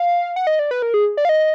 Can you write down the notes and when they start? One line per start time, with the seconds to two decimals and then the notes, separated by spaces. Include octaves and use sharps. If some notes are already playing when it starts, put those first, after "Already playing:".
Already playing: F5
0.36 F#5
0.47 D#5
0.59 D5
0.71 B4
0.82 A#4
0.94 G#4
1.17 D5
1.25 F5
1.29 D#5